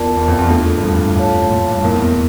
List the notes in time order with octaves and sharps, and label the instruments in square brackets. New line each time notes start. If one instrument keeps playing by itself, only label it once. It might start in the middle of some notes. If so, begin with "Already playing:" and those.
Already playing: [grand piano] E2 [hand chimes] F4 A#4 D5 A5
[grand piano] E2
F2
E2
[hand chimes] A3 D4 F4 A4
[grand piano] G2
F2
G2
A2
[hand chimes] F4 C#5 F5 A5
[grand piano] A2
A#2
G2
[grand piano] F2 [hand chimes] A#3 E4 A#4
[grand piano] E2